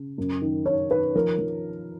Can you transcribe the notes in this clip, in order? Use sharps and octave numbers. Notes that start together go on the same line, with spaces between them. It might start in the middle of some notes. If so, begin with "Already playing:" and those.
Already playing: C#3
F#2
D#3
D#3 C#5
D#3 B4
F3 A#4
F3